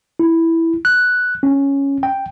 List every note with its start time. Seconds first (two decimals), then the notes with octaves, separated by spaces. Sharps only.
0.19 E4
0.85 F#6
1.43 C#4
2.03 G5